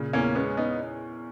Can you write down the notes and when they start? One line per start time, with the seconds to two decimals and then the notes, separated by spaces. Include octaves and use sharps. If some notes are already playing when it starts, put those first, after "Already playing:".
Already playing: A#2 C#3
0.13 E2 A#3 C#4
0.35 G#3 B3 C#4
0.57 B3 D#4